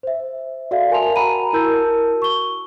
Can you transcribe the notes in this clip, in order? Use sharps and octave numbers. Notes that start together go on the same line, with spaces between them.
C5 E5
F#4 A4 D5 E5 F5
F#4 A#4 G#5 A5 C6 F7
F#5 G#5 A#5 B5 D#7
E4 F#4 A#4 A5 E6 G6
C#6 G7